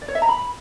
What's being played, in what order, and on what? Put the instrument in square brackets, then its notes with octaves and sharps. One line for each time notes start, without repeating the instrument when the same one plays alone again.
[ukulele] D5
C#5
E5
A#5
B5